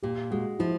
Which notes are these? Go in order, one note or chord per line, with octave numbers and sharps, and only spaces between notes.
A#2 G4
G#3 F#4
F3 E4